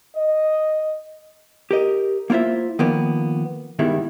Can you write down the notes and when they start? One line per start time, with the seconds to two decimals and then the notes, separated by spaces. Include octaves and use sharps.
0.16 D#5
1.71 G4 A#4 D#5
2.30 A#3 E4 F4 C5 E5
2.79 D#3 F3 A#3 B3 D#4
3.79 G2 B2 D#3 G3 G#3 E4